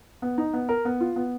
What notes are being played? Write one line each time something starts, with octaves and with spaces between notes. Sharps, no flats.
B3
D#4
B3
A#4
B3
F4
B3